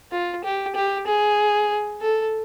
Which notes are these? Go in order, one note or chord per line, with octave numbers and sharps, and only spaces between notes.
F4
G4
G4
G#4
A4